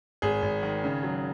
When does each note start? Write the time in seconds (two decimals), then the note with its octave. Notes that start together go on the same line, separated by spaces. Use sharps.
0.22 G#1 G#4
0.42 G#1
0.63 D#3
0.84 C#3
1.03 F#3